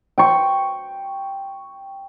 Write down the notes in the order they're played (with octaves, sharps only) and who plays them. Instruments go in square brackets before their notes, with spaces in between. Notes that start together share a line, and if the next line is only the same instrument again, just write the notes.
[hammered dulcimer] G5 C#6